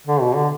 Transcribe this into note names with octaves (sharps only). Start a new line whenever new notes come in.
D3
B2
D3